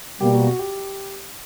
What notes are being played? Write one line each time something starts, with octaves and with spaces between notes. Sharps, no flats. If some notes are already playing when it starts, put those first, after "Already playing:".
B2 G3 A#3 G4
F#4
F#4
G4